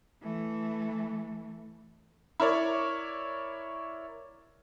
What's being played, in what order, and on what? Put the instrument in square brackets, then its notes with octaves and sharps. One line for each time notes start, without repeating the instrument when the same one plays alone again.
[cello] E3 A3
[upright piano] E4 A#4 C#5 D5